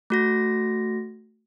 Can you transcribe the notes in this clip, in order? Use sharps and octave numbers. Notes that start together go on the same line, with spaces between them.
A3 F#4 A#6